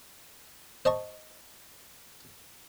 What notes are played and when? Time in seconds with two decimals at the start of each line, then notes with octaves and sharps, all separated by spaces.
0.85 C5 D#5 A5 C#6